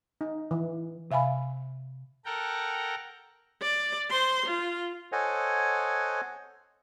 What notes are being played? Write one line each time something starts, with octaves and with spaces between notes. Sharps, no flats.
D#4
E3
C3 E5 F5 G#5 B5
A4 A#4 F#5 G5 A#5
D5
C5 C6
F4
A4 C5 C#5 D#5 F#5 G#5